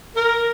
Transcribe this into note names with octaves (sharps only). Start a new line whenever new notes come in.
A#4